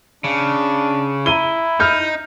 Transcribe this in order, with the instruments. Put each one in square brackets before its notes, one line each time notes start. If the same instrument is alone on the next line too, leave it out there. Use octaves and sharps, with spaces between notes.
[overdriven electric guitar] C#3 [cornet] D4
[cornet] E4 [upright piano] A#5 D#7 G7
[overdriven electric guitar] D#4 [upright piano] F6 G6